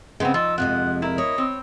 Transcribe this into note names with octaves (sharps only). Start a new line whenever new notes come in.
C#3 G#3 B3 C4
F3 D#4 E6
F2 C3 G#3 F#5
E4 A#4
C#5 D#5
C4